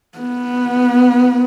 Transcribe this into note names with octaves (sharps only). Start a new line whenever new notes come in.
B3